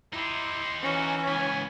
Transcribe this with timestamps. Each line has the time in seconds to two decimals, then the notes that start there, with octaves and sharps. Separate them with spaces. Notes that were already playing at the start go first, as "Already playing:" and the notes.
0.13 D#4 E4 G4 C6
0.82 E3 C#4 F#4
1.28 C#2 B3 G#5